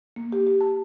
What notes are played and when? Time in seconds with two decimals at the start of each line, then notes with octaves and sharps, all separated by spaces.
0.16 A#3
0.32 G4
0.47 G4
0.61 A5